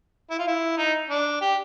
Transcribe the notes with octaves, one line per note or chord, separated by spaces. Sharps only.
E4
F4
E4
D#4
D4
G4